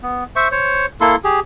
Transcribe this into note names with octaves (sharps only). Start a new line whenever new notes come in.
B3
C5 E5 C#6
C5 C#5
A#3 E4 A4 C6
G4 G#4